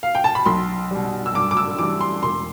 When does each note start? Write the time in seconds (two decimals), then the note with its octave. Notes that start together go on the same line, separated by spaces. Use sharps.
0.03 F5
0.15 G5
0.24 A5
0.35 B5
0.46 B1 C6
0.91 B2 G3
1.26 E6
1.34 G2 D6
1.51 D6
1.57 E6
1.79 E3 G3 D6
2.01 C6
2.23 E1 C6